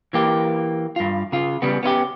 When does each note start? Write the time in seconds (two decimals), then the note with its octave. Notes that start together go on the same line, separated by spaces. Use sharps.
0.13 E3 A#3 G4
0.96 G2 F4
1.32 C#3 F4
1.62 C#3 G3 B3
1.83 B3 C#4 E4 G4